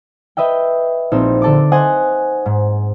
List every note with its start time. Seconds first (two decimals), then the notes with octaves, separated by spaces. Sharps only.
0.37 B4 D#5 E5 G5
1.12 A#1 C4 D#4 E7
1.42 D3 A4 D6
1.72 C5 D#5 F#5 G#5
2.46 G#2